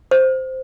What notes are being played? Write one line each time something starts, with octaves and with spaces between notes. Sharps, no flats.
C5